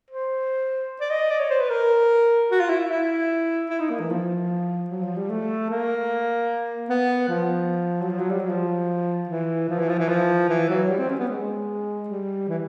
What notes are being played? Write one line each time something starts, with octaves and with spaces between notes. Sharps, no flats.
C5
D5
D#5
D5
C#5
C5
B4
A#4
F#4
F4
E4
E4
E4
D#4
A#3
E3
F3
F#3
F3
G3
A3
A#3
B3
F3
F#3
F3
F#3
G3
F#3
F3
E3
F3
E3
F3
E3
F3
E3
F#3
G3
C4
C#4
B3
G#3
G3
E3